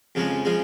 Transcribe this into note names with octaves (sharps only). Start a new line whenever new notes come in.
F2 C#3 F3 G#3
C#3 F3 G#3